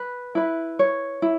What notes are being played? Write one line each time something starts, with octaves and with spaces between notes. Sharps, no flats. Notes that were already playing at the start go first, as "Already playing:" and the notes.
Already playing: B4
E4 B4
C#5
E4